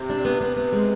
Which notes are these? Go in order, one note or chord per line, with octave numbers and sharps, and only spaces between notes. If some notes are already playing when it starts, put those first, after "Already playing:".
Already playing: C3
D4
B3
B3
B3
G#3